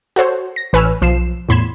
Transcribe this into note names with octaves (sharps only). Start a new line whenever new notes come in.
F#4 A4 C5 C#5
A#6
A1 B4 C#5 G#5 E6 F6
B1 F3 C7 E7
E2 A2 B5 C6 G#6 E7